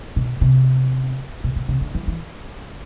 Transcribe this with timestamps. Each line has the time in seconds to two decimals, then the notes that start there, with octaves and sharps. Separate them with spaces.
0.16 B2
0.41 C3
1.44 B2
1.56 B2
1.68 C3
1.81 D3
1.95 E3
2.07 E3